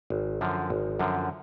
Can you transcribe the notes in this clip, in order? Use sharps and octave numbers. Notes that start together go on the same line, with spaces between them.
G#1
F#2 D3 F3
G#1
F#2 D3 F3